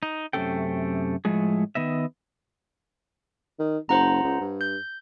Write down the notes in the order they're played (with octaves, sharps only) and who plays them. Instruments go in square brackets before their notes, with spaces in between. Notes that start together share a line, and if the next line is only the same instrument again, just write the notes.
[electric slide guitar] D#4
F#2 C3 A3 C#4 A4 G5
A2 F3 G#3 A3 G#4
D#3 B3 D#5 E5
[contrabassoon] D#3
[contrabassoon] F#1 [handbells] C5 F#5 A#5
[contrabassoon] C#2
G2
[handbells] G6